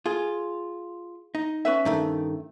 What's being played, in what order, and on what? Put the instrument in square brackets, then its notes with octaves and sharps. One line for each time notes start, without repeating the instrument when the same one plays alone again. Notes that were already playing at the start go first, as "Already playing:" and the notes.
[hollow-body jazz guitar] F4 [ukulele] G#4
[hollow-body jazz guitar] D#4
[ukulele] C#4 B4 E5
[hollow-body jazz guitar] G2 D#3 A3